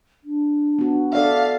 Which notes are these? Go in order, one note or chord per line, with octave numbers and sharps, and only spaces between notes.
D4
B3 F#4
A4 D5 E5 F5